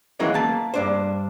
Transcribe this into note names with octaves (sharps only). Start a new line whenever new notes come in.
D#3 E3 F#3 G#3 A#3 C#4
A#3 A5
G2 D4 C5